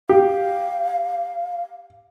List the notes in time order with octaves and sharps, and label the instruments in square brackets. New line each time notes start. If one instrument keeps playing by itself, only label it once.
[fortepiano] G4 [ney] F5